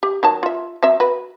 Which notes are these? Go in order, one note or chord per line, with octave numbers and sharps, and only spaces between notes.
G4
D#3 F#3 A5
F4 E5
F#3 C4 E5
F#4 B4